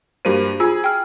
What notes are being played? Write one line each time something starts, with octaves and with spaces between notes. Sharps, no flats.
G2 A#3 F#4 G4 C5 D#7
F4 G#4 E6
G5 F6